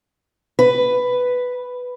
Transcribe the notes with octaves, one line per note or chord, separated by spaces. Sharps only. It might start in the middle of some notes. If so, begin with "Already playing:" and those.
B4